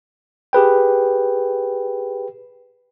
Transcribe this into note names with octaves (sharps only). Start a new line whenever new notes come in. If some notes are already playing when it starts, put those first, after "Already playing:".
G4 G#4 B4 G5